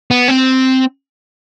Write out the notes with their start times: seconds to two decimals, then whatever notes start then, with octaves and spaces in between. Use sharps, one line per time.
0.11 B3
0.28 C4